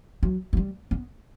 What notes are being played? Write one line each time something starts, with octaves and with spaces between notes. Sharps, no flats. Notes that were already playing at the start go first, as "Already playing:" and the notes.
F#3
F#3
G3
B3